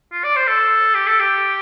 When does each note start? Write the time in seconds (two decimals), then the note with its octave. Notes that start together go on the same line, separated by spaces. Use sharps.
0.12 F4
0.24 D5
0.36 C5
0.47 A4
0.94 G4
1.07 A4
1.20 G4